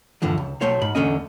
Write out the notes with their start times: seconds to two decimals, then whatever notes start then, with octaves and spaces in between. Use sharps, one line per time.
0.22 E2 G2 D3 E3 F3
0.38 C#2
0.61 B1 A3 C5 C#5
0.82 G#2 B5
0.95 E2 B2 D3 A3 C#4 D#5